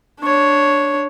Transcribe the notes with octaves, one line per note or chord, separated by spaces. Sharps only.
D4 C#5